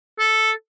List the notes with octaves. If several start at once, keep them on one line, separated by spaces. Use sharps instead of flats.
A4